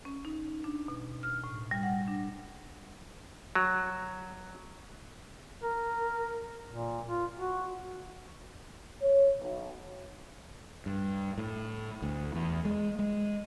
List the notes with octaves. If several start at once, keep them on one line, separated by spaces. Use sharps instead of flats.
C#4
D#4
D4
B2
F6
A2
G3
F#5
D4
F#3
A#4
A#2
F4
F#4
C#5
B1
G2
A2
D2
E2
G#3
G#3